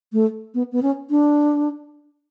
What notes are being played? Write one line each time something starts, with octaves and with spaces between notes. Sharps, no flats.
A3
B3
B3
C#4
D4